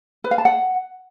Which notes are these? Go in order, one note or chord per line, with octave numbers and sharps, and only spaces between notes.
B4
F5
A5
F#5